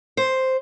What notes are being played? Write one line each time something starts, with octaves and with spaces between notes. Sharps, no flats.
C5